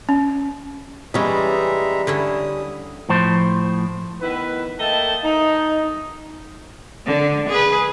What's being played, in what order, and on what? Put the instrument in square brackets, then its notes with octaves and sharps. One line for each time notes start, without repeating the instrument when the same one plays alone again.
[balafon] C#4
[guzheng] E3 C#4 [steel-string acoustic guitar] G3 D#5 [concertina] G#3 E5 A#5
[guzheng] D3 C#4 E4 [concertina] D#6
[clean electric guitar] A2 F3 C5
[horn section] D#3 B3 E4 B4
A3 A#3 D#5 E5 G5 A5
D#4
[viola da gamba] D3
G#4 B4